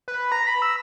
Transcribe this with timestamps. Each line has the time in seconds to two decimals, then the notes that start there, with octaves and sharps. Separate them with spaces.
0.08 B4
0.32 A#5
0.47 B5
0.62 E6